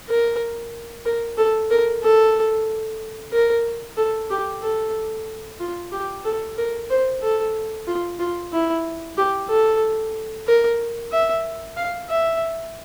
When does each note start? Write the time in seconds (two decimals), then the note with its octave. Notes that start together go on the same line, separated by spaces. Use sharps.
0.08 A#4
1.05 A#4
1.38 A4
1.71 A#4
2.03 A4
3.32 A#4
3.97 A4
4.30 G4
4.62 A4
5.60 F4
5.92 G4
6.25 A4
6.58 A#4
6.90 C5
7.22 A4
7.87 F4
8.19 F4
8.52 E4
9.17 G4
9.49 A4
10.47 A#4
11.12 E5
11.77 F5
12.09 E5